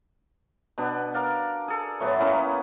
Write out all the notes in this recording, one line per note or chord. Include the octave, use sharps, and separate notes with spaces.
B2 B3 D4
A#4 D5 F5
G#4 A4
A2 E3 F#3 B3
A#3 B3 C#4 E4